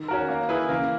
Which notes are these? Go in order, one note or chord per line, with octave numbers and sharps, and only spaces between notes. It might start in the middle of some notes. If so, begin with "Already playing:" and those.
Already playing: D#3
C#4 F#4 A#4
A#3
E4 G#4 B4
C#3 E3 A#3